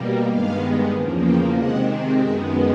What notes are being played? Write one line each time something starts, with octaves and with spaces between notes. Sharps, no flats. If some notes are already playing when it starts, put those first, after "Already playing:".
Already playing: B2 G3 A#3
G2 D#3 G#3 B3 F5
E2 C#3 F3 A#3
G5
C3 D#3 G#3 C4 F#5
F#2 D#3 G#3 B3 E5